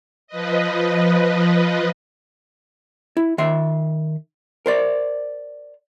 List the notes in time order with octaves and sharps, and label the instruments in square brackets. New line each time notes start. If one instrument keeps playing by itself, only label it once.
[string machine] F3 B4 D#5
[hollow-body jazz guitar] E4
D#3 E5 C6
A#4 C5 D5